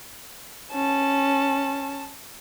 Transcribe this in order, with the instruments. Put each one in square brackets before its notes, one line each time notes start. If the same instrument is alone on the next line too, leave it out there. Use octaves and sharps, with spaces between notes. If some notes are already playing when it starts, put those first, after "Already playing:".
[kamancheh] C#4 A5